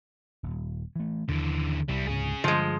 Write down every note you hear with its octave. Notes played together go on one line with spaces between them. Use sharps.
D#1
E3 A3
D#2 D3 E3
C2 G3 E4
C#2 G#2 C3 C#4 G#4
G2 D3 F3 G#3